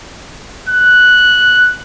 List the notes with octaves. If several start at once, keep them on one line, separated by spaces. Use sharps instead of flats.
F#6